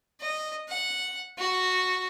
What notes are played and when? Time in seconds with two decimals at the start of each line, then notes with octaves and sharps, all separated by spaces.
0.21 D#5
0.69 F#5
1.38 F#4